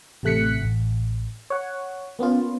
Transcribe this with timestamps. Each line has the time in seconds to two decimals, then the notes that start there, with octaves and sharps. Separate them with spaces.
0.23 A1 C3 A3 F#6 B6 C#7
0.62 A1
1.50 C#5 F#5
2.19 A#3 B3 C#4 F4